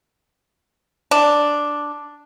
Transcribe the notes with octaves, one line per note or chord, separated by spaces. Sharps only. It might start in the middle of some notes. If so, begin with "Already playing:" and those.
D4